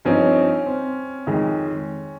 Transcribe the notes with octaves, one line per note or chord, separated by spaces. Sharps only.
G2 F3 C4 C#4 D#4
C4
F2 D#3 G#3